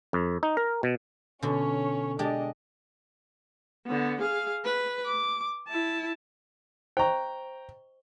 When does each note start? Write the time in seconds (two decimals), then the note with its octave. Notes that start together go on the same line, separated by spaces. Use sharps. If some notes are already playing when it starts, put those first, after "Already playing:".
0.13 F2
0.43 D#4
0.57 A#4
0.83 B2
1.43 B2 D3 C#4 C#5
2.19 G#3 D4 G4 D#5 A5
3.87 D3 B3
4.21 G#4 F5
4.65 B4
5.06 D6
5.68 E4 A5
6.97 C5 D#5 G5 A#5 C#6